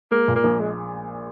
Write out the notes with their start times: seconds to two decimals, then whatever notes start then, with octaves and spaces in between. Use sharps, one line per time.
0.11 G#3 A#3
0.28 A#2
0.36 A#3
0.44 A#1
0.60 G#3